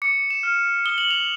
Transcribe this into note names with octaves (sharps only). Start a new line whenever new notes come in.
D6 C#7
E7
F6
D#6 G7
F#7
F7